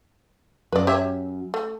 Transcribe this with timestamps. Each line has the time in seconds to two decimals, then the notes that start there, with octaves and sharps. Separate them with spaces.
0.72 F#2 B4 D5
0.87 G4 C#5 E5
1.54 A3